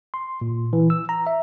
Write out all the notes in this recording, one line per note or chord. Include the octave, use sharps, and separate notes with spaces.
C6
A#2
E3
E6
A#5
E5